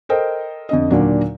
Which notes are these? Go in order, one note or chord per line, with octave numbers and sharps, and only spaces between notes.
A4 A#4 C5 D#5 G5
F2 D3 D#5
D#2 A#2 D3 F#3 D4